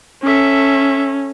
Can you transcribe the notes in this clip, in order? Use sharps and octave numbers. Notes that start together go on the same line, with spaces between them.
C#4 A4 E5